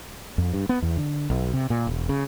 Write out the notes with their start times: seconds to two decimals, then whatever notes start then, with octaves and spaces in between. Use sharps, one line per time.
0.38 F2
0.53 G2
0.69 B3
0.82 E2
0.97 D3
1.30 B1
1.54 C3
1.70 A#2
1.87 E1
2.09 C#3